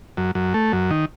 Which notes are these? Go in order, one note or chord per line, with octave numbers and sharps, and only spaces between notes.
F#2
F#2
A3
F#2
D#3